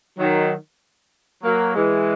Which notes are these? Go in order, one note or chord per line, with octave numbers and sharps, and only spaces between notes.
D#3 F#3
F#3 A#3
E3 G#3